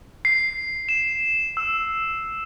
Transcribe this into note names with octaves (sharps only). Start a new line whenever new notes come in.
C7
E7
E6